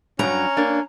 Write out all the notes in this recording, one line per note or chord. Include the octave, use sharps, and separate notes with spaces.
G2 F#3 C#4 A#5
A#3 D4